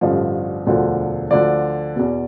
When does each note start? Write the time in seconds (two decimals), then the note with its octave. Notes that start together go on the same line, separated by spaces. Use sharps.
0.01 A1 G2 D3 F3
0.66 E1 D2 D3 F3
1.30 D2 D3 F3 D5
1.96 E2 B2